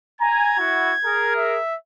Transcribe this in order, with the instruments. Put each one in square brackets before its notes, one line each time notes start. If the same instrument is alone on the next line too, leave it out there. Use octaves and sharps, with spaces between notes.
[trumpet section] G#5 A#5 [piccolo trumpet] G#6
[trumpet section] E4 F#4
G#4 A#4
[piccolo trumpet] E5